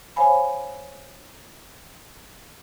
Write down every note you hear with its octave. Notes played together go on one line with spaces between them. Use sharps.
C5 C#5 F5 G#5 B5